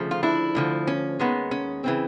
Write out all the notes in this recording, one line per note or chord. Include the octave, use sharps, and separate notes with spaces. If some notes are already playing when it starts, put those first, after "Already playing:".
Already playing: D2 C#3 F3 A3
F4
D4 E4
D2 D3 F3
C#4
D#2 D#3 G#3 B3
C#4
C#3 E3 C4